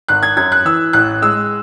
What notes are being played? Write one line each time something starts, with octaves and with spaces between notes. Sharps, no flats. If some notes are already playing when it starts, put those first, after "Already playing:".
G#1 F#6
G#6
F#2 G#6
F#6
E3 E6
A1 F#6
G#3 E6